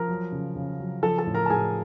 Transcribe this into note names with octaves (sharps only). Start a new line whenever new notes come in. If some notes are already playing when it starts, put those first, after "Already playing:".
Already playing: F3 A#4 A#5
F#3
C#3
C#3
F#3
F3 A4 A5
A4 A5
A2
A#4 A#5
A5
A2 G#4 G#5